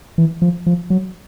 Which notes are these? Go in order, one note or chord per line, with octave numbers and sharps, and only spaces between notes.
E3
F3
F3
F#3